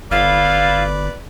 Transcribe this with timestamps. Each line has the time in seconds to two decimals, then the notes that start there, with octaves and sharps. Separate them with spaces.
0.11 G1 E4 F4 B4 D5 F5